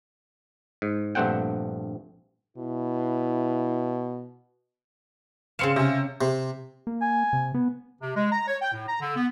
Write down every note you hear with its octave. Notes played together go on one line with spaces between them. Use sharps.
G#2
A#1 G2 A3 C4 F#5 G5
B2 E4
C#3 C4 F5 C6 C#7 E7
C3 C#4
C3
A#3
G#5
C3
B3
C3
G#3
A#5
C#5
G5
A2
A#5
D3
B3